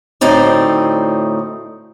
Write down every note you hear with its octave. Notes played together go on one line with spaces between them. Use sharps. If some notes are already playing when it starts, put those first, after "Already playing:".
D2 A2 C4 D#4 D5